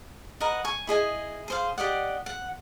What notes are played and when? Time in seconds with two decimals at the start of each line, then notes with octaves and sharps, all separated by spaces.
0.40 A#4 B4 D#5 F#5
0.64 G#5 C#6
0.87 E4 G#4 D#5 G#5
1.48 G#4 C5 F5
1.78 G4 D5 D#5 F#5
2.26 F#5